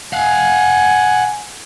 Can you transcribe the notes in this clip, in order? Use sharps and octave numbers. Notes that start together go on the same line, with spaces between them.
F5 F#5 G#5